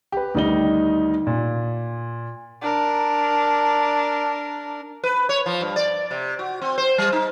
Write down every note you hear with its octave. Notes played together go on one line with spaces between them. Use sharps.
G4 B4
D2 D#3 G3 D#4 D#5 G7
A#2
D4 A#4
B4
C#5
F3
G2
D5
C3
F#4
C4
C5
G3
D#4